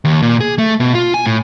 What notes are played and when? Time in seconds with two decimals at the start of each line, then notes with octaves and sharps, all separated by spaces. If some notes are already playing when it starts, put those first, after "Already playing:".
0.05 D#2
0.22 A#2
0.40 G#4
0.58 A3
0.80 B2
0.95 F4
1.14 G#5
1.26 A2